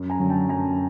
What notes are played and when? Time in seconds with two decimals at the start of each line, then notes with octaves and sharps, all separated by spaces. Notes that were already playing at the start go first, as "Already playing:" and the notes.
Already playing: F#2
0.10 G#5 A#5
0.20 D3 F#3
0.30 G5 A5
0.49 F#2 G#5 A#5